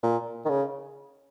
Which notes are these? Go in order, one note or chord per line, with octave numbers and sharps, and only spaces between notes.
A#2
D#3
C#3